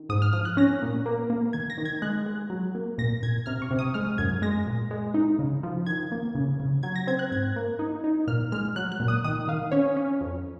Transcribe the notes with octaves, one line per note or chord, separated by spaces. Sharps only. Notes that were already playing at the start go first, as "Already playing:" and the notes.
Already playing: D#3
G#2 D#6
F6
F3 F6
F#6
C#4 A#6
A#2
A#3
A#3
D#3 G#6
A#6
D#3
G#6
G#3 F#6
G#3
F#3
A#3
A#2 A#6
A#2 G#6
C3 F6
C#6
C3
D#6
G#3 F6
F#2 G#6
G#3 A#6
A#2
G#3
D#4
C#3
F3
D#3 G#6
A#3
C#3
C#3
F#3 G#6
A#6
C4 G#6
F#6
G#2 G#6
A#3
D#4
D#4
A#2 F6
G#3 F6
F#3 F#6
F#6
A#2
D#6
D#3 D#6
D#3 F5
C#4 C#5
C#4
F2